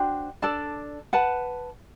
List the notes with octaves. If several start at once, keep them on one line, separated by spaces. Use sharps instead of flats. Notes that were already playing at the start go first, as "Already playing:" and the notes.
Already playing: D4 F#4 C5 G5
D4 A4 D5 A5
B4 F#5 A5